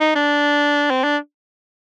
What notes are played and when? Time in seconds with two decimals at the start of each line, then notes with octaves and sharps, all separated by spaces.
0.01 D#4
0.15 D4
0.90 C4
1.04 D4